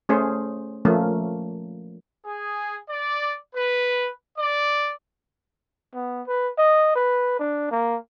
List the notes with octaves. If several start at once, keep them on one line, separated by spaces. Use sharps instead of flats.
A3 C#4 G#4 C5
F3 A3 A#3 C#4
G#4
D5
B4
D5
B3
B4
D#5
B4
D4
A#3